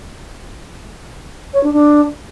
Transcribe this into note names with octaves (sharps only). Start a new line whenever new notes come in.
C#5
D4
D4